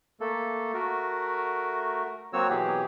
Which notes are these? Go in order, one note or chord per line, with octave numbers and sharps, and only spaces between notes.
A3 A#3 A4
A3 F#4 A#4
F#3 A#3 C4 F#4 C#5 E6
B2 E3 F#3 G4 G#4